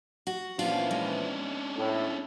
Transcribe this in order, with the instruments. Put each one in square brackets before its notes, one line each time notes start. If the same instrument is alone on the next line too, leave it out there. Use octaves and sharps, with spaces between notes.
[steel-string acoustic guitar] F#4
[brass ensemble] A#2 E3 F3 [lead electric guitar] C#4 D4 [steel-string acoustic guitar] F4
[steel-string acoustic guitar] G#3
[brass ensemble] A2